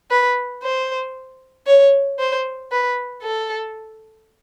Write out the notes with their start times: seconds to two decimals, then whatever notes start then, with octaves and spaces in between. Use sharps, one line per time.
0.10 B4
0.63 C5
1.67 C#5
2.19 C5
2.71 B4
3.22 A4